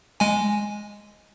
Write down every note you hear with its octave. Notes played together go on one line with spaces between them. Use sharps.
G#3 G#5